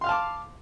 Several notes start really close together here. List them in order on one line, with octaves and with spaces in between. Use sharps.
C6 F5 F6 A5 D6